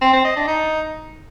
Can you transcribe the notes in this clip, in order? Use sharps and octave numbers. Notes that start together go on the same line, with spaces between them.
C4
C4
D#5
D4
D#4